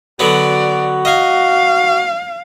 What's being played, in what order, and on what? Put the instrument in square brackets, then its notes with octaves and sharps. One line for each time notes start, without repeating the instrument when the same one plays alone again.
[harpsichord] D3 F#3 B3 [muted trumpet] F#4 [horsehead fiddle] D5
[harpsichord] D#5 G#5 [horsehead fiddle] F5